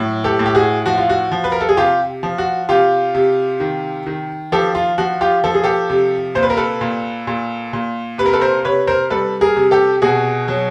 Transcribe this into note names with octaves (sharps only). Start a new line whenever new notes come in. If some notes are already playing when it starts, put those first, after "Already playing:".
Already playing: A2 F#3
G4 A4
A2
G4
F#4 G#4
F3 F#4
F4
F#4
F3
B4
A#4
A4
G#4
C3 F4 G4
F3
F#4
C3 F4 G4
C3
D#3
D#3
F3 G4 A4
F4
F3 F#4
F4 G4
F3 A4
G#4
G4 A4
C3
A#2 C5
B4
A#4
A4 B4
A#2
A#2
A#2
C3 B4
A#4
A4 B4
A#4 C5
C3 B4 C#5
A#4 C5
G3 A4 B4
G#4 A#4
C3
G4 A4
B2 F#4 G#4
F#3